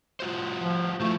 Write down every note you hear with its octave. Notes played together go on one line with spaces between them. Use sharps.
F4 F#4 C5
F3
F3 A3 E4 F4